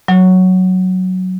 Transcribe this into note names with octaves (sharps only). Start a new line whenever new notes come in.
F#3